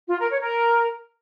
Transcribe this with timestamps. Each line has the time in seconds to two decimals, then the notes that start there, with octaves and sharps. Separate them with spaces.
0.09 F4
0.20 A#4
0.31 C#5
0.41 A#4